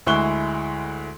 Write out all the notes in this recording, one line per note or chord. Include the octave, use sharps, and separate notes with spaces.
D2 G#3 E4 C#6 F#6 G7